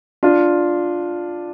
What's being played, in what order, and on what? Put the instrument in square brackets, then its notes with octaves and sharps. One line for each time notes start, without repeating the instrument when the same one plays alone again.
[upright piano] D4 F4